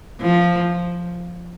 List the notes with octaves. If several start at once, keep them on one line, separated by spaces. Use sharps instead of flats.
F3